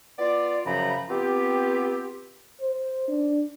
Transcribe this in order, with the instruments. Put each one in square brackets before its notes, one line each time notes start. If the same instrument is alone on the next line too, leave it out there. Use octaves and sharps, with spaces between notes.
[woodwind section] B3 F4 D5
F#2 C#3 F3 A#5 B5
B3 C4 F4 G4
[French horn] C5
D4